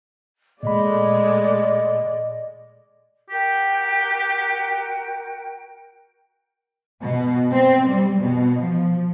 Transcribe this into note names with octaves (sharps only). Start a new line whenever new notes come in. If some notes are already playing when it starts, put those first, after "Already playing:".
A#2 G#3 A3 D5 D#5 B5
F#4 G4 A#4 G5
B2
C4
G3
B2
F3